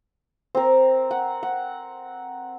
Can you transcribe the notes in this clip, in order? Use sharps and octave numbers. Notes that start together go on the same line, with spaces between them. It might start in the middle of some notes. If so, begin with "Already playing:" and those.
C4 A#4
F#5
F#5